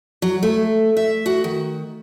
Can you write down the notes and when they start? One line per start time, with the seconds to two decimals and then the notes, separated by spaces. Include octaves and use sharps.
0.22 F#3
0.43 A3
0.97 E5
1.26 F#4
1.44 D#3